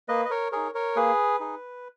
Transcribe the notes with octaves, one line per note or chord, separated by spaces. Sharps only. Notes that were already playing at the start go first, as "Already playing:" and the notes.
A#3 B4 D#5
D#5
A#4 C#5
D#4 G#4 A#4 C#5
A#4 C#5
A#3 G#4 B4
D#4 G#4